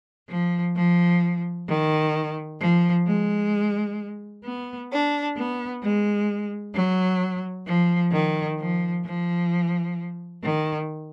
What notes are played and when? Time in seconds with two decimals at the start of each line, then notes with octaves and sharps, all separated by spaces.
0.30 F3
0.76 F3
1.69 D#3
2.60 F3
3.06 G#3
4.45 B3
4.91 D4
5.36 B3
5.82 G#3
6.75 F#3
7.67 F3
8.13 D#3
8.59 F3
9.05 F3
10.43 D#3